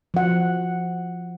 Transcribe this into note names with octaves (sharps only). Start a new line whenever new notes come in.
F3 F#5